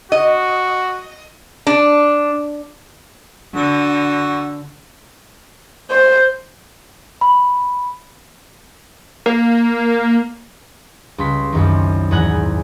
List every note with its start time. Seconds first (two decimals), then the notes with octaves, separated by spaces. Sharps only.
0.12 F#4 D#5
1.67 D4
3.55 D3 F#4 E6
5.90 C5
7.21 B5
9.26 A#3
11.18 C#2 G3 C6 B6
11.53 C2 F#2 D#3
12.11 E2 G#2 F#5 G#5 A#5 F#6